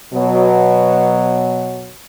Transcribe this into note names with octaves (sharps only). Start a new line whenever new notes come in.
B2 F#3